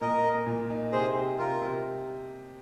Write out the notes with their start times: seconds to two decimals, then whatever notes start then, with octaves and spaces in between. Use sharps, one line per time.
0.01 A#2 A#4 D#5
0.24 A#3
0.47 A#2
0.70 D#4
0.92 C3 G#4 C5
1.15 C3
1.38 C3 F4 A#4
1.62 C3